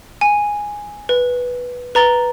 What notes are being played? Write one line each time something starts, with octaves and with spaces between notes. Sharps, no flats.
G#5
B4
B4 A#5 A6 G7